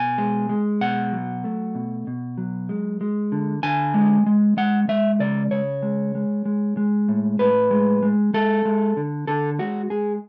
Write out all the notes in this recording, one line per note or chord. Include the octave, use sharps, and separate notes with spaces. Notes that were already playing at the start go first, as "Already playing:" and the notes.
Already playing: B2 G#5
G#3
G#3
B2 F#5
F#3
A3
B2
B2
F#3
G#3
G#3
D3
D3 G#5
G#3
G#3
G#3 F#5
G#3 E5
C#3 D5
C#3 C#5
G#3
G#3
G#3
G#3
A2
A2 B4
G#3
G#3
G#3 A4
G#3
D3
D3 A4
G#3 F#4
G#3 G#4